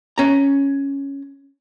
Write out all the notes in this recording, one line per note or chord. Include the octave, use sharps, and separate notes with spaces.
C#4 A#5